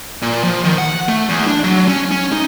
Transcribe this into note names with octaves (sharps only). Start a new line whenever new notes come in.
A#2
F3
D#3
F#5
A3
E2
D4
F#3
C#4
C#4
D#4